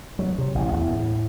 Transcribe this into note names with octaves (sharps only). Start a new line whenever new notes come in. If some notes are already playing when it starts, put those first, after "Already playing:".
F#3
C3
A1
E2
A2